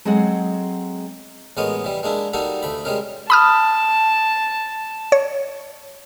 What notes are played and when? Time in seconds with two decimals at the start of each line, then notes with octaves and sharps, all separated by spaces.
0.05 F#3 G#3 C4 G#4 A4 F#5
1.57 A1 G#3 B3 A#4 C#5 D#5
1.84 E3 G3
2.03 G#3 A#3 D4 E4
2.33 G3 A#3 D#4 F#4 A4
2.63 D2 A3 B5
2.85 G3 G#3 C#4 A#4
3.30 A5 B5 D#6 F6
5.12 C#5